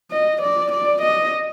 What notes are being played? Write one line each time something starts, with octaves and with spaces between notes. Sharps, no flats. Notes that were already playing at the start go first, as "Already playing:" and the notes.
D#5
D5
D5
D#5